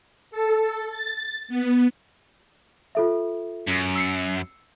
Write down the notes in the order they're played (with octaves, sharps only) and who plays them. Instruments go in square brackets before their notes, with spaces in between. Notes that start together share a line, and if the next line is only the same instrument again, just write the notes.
[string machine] A4
A6
B3
[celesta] F4 A4 E5
[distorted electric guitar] F#2
[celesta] E6 C7 C#7